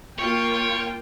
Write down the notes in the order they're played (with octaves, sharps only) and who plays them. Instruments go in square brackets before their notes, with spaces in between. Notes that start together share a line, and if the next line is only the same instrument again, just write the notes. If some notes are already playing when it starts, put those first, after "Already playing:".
[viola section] A#3 F4 G5 [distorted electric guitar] C#5